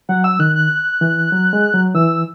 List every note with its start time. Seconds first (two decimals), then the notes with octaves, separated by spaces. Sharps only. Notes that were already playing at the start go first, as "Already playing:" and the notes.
0.09 F#3 F#5
0.24 E6
0.39 D#3 F#6
0.55 F#6
1.01 E3
1.32 F#3
1.53 G#3
1.74 F#3
1.95 E3 E6